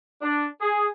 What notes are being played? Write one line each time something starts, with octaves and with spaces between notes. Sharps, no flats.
D4
G#4